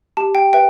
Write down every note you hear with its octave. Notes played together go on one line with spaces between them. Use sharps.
G4 A5
G5
B4 E5 G5